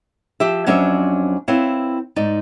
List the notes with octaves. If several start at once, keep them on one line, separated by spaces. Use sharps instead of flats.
F3 G4 E5
F2 F#3 C#4 D4 C5 E5
C4 E4 B4 C#5 F5
G#2 D#4 D5